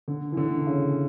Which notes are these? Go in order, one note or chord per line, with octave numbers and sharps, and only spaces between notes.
D3
E3
D3
C#3